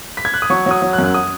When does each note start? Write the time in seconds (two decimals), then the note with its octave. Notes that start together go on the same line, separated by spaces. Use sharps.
0.17 B6
0.25 G#6
0.34 F#6
0.42 D#6
0.50 F#3 C#6
0.66 F#3 D#6
0.82 F#3
0.93 F#6
0.98 F#2
1.03 F#6
1.14 D#6